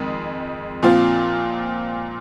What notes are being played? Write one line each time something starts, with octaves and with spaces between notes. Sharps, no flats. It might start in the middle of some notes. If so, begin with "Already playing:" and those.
Already playing: F2 D#3 G#3
A#2 F3 C4 F4